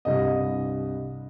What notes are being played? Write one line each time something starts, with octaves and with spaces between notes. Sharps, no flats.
C2 G2 D#5